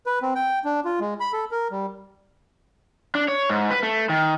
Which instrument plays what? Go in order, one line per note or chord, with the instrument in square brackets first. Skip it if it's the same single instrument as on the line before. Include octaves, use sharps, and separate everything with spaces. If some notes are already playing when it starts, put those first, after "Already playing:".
[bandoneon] B4
C4
G5
D4
F4
G#3
B5
A4
A#4
G3
[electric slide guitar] D4
C#5
G#2
B4
A3
D#3